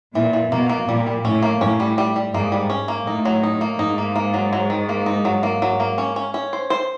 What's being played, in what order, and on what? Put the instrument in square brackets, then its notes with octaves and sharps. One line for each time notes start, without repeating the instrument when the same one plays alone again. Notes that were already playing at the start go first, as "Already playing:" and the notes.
[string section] A#2 [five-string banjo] E3
[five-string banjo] E3
[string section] B2 [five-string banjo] A#3
[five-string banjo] A#3
[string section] A#2 [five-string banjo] G3
[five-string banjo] G3
[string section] A2 [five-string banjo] C#4
[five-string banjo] A#3
[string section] A2 [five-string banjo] C#4
[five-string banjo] G3
G3
G3
[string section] G#2 [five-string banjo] A#3
[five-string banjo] G3
C#4
A#3
[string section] A2 [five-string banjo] D#4
[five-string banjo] F#3
D#4
A#3
[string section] G#2 [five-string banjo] D#4
[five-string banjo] A#3
A#3
F#3
F#3
D#3
A#3
D#4
F#3
A#3
F#3
A#3
C#4
C#4
C#4
C5
C5